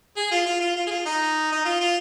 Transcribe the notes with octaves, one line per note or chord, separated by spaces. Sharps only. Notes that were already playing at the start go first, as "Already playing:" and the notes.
G#4
F4
F4
F4
F4
G#4
F4
D#4
D#4
F4
F4